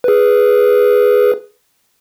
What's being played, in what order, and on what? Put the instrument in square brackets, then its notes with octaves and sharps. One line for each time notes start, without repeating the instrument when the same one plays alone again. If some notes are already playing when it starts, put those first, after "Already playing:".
[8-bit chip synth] G#4 B4